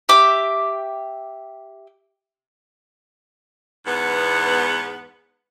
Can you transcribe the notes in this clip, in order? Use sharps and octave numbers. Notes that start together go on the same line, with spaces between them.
G4 E5 D6
E2 G#2 B3